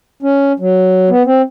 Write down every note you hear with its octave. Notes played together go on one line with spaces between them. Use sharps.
C#4
F#3
B3
C4